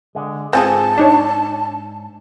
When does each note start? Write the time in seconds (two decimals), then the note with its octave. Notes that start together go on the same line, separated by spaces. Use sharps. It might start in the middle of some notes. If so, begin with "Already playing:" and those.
0.15 D3 G#3
0.53 G#2 C4 F4 G#4 G#5 A5
0.98 D4 D#4 C#5